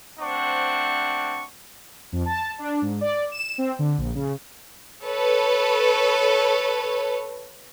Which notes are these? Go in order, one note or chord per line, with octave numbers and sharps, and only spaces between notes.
A3 C4 D4 C5 F#5 C#6
F2
A5
D4
G#2
D5
E7
C4
D3
A#1
C#3
A4 B4 C#5